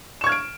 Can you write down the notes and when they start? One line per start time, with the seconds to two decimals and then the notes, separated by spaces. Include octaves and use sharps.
0.21 E7
0.24 C#6
0.26 G#6
0.29 F6
0.32 D7